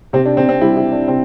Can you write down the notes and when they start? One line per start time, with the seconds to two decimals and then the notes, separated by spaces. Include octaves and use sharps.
0.13 C3 C4
0.25 D4
0.37 C3 C4
0.49 C4
0.61 G3 E4
0.77 E4
0.84 G3
0.92 D4
1.08 C3 C4